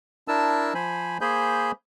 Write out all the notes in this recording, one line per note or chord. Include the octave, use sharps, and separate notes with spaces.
D4 E4 A#4 A5 E6
F3 C5 G#5 B5
A#3 G#4 C5 G#5 B5 G6